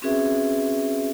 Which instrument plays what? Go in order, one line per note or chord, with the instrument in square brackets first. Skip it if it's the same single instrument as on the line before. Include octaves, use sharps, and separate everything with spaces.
[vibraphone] C4 C#4 F#4 G#4 B4 E5